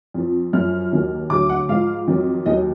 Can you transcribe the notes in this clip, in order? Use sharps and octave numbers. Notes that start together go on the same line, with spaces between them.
F2 F3
F#2 F3 F6
D#2 D#3 F#3
D2 D3 F#3 D6
F#5
G#2 F3 F5
F2 D#3 F#3
D#2 D#3 F#3 D#5